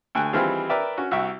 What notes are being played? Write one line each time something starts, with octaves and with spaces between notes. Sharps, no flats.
D2 G5 G#5 F#6
D#3 E3 G3 C4 F4 G#4
A#4 B4 D5 E5 G5
C#4 F#4
C2 F#4 E5 G5 C#6